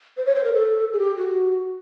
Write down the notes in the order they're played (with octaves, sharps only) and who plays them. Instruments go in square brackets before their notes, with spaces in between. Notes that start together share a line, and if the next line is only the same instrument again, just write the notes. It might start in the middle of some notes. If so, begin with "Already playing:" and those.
[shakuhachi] C5
C#5
C5
A#4
A4
G#4
G4
F#4